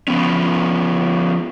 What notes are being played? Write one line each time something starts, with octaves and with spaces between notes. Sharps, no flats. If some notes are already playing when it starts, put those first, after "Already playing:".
F3 B3 C#4